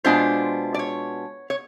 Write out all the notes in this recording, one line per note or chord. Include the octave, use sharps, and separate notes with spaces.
B2 G#3 B3 D4 F4 C5
D5
C#5
C#5